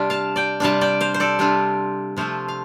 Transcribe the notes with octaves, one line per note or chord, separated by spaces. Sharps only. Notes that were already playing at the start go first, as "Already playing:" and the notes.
Already playing: C3 G3 D4 F4
F5 A5
D5 G5
C3 G3 D4 F4 F5 A5
D5 G5
C5 F5
C5
A4 D5
C3 G3 D4 F4
C3 F3 A3 F4 C5 F5
F5